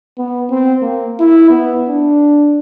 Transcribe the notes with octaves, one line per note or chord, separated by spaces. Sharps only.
B3
C4
A#3
E4
B3
D4